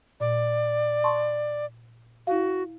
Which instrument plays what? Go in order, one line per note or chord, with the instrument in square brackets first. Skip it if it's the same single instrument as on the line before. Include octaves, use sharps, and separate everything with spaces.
[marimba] A#2 [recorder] D5
[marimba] A5 C6 C#6
[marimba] E4 F5 [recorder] F#4